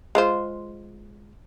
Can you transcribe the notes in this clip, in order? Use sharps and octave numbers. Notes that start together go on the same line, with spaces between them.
G#3 F4 C5